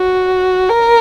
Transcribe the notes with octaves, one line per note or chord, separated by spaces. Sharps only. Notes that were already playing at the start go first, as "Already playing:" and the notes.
Already playing: F#4
A#4